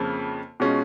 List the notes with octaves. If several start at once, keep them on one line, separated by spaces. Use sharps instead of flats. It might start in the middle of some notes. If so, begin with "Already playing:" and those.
Already playing: F2 C#3 F3 A#3
B2 G#3 C#4 F4